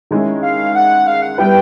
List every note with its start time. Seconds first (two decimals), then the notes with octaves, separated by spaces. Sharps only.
0.11 D#3 G#3 C#4 E4
0.43 F5
0.75 F#5
1.06 F5
1.22 F#5
1.38 G3 B3 E4 G4 B4 G5